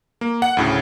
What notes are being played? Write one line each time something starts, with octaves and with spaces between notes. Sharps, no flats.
A#3
F#5
D2 A2 C#3